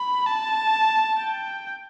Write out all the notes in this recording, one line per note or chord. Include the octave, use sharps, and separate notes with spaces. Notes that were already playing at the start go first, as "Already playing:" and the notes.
Already playing: B5
A5
G5